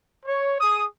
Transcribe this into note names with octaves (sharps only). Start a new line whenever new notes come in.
C#5
G#4 D#6